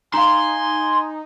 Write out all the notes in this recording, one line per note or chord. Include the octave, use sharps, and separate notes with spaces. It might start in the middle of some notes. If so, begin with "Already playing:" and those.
D#4 F5 G#5 A#5 C6